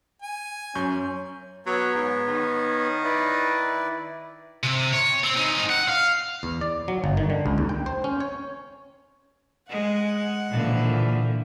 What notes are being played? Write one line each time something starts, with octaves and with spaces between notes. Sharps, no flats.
G#5
F#2 C#4 C#6 G6
F#3 B3 C#5
G#2
D#3
E4 B4 D5
C3
C#5
C4
C4 D#4
F#5
F5
E2
D5
F#3
G1
D#3
D3
C#2
D#2
G5
C5
C#4
C#5
G#3 F#5
A#2 D3 E3 F3